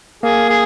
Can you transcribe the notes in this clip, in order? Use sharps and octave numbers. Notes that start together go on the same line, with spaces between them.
A#3 G#4
G#4